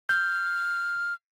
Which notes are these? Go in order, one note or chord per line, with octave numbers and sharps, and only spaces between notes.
F6 G6